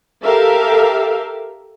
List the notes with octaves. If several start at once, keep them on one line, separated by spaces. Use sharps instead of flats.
G4 A4 A#4 E5 F5